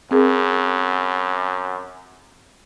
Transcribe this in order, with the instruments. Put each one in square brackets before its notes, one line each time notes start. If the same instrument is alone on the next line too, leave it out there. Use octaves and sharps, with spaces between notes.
[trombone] F#2 [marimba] C4 G#4 A#4